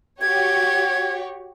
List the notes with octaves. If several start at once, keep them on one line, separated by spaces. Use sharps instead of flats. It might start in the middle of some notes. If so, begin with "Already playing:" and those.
F#4 G4 C#5 G#6